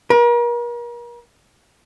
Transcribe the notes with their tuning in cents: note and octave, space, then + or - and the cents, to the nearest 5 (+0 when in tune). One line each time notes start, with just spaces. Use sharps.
A#4 +40